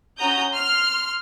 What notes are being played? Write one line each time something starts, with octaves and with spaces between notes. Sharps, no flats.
C#4 F#4 A#5 D#6 G6
C6 F6